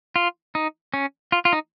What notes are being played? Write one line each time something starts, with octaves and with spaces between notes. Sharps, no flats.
F4
D#4
C#4
F4
F4
D#4